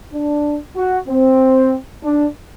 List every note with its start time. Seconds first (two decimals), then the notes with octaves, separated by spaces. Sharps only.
0.13 D4
0.76 F#4
1.08 C4
2.04 D4